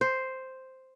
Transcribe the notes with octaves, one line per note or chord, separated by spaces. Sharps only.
C5